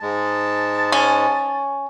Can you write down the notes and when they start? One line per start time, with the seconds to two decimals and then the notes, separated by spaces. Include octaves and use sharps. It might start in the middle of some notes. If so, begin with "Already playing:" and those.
0.01 G#2 G#3 A5
0.92 C#4